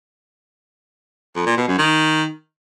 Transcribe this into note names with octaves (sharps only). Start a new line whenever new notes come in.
F2
A#2
B2
F#2
D#3